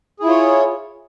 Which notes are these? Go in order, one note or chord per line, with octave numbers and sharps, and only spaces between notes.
E4 F4 G#4 C#5